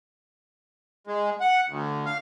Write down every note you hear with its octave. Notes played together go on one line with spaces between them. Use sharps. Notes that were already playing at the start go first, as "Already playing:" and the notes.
G#3
F#5
D2
F5